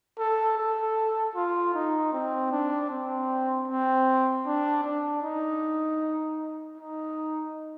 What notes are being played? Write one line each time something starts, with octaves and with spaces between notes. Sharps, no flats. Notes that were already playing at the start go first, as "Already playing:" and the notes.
A4
A4
F4
D#4
C4
D4
C4
C4
D4
D4
D#4
D#4